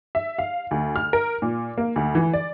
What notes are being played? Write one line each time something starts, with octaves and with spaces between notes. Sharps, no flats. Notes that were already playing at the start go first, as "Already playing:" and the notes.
E5
F5
D2
F6
A#4
A#2
A#3
D2
E3
D5